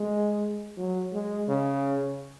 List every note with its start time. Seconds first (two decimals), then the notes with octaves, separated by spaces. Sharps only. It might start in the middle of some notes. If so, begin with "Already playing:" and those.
Already playing: G#3
0.77 F#3
1.13 G#3
1.48 C#3